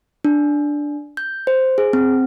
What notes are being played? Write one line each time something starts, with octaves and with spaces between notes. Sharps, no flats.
D4
G6
C5
G#4
C4